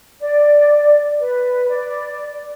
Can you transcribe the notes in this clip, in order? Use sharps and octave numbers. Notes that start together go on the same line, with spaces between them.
D5
B4
D5